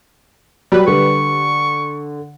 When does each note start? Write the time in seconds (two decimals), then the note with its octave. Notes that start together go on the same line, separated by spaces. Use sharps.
0.72 F#3 G3 B4
0.87 D3 C#6